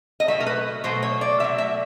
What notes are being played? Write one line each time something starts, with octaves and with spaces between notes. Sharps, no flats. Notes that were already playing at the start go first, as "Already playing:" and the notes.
D#5
B2 F#3 A3 E5
A#4
B4
B2 F#3 A3 C5
C#5
D5
B2 F#3 A3 E5
E5